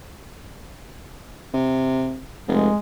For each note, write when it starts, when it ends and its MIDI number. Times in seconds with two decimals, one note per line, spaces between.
1.54 2.19 48
2.48 2.68 29
2.48 2.78 56